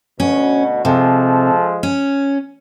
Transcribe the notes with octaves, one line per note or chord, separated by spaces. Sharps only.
D2 B2 C#4
C3 F3 G#3 A4
C#4